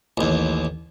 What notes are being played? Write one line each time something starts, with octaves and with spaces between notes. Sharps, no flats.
A1 D#2